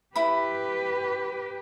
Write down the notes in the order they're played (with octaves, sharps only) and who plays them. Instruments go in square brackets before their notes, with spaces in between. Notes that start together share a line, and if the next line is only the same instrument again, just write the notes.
[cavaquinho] E4 B5 [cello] G4 B4